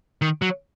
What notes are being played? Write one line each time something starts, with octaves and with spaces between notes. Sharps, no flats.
D#3
F#3